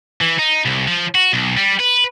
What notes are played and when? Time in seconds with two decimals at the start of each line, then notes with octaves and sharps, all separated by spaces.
0.21 E3
0.39 D#4
0.65 C2
0.88 F3
1.15 F#4
1.33 B1
1.57 G3
1.79 B4